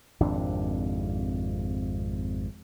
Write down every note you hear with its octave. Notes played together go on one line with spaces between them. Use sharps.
G#1 F2 C3 D4